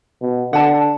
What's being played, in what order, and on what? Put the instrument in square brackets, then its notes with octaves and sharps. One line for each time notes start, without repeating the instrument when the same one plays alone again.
[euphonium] B2
[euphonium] D3 [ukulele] F#5 A5